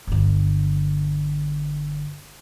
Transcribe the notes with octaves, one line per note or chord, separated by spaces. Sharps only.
G1 D3